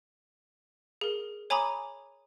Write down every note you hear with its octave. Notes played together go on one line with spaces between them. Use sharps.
G#4 A#4
C#5 G#5 A#5 B5 D6 D#6